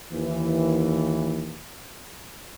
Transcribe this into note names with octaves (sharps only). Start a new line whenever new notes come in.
D#2 E3